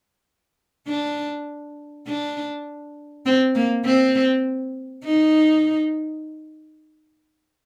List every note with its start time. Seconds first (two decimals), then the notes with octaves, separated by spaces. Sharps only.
0.88 D4
2.07 D4
3.26 C4
3.55 A#3
3.85 C4
5.04 D#4